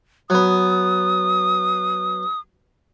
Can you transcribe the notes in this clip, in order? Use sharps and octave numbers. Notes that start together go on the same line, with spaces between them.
F#3 B3 D#6